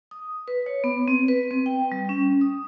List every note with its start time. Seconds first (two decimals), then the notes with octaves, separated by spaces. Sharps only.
0.11 D#6
0.48 B4
0.66 C#5
0.84 B3
1.08 C4
1.28 B4
1.51 C4
1.66 G5
1.92 G3
2.09 C#4
2.41 D#6